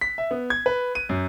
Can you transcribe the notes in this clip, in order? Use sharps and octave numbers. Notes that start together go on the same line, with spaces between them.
B6
E5
B3
G#6
B4
D#7
F#2